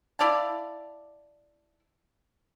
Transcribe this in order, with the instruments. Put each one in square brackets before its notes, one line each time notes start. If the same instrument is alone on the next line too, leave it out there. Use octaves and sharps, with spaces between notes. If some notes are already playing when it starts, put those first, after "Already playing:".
[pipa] E4 D5 F5 A5